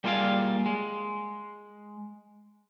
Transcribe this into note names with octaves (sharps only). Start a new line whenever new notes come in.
G3 A#3 F4 G#4 D5 F5
G#3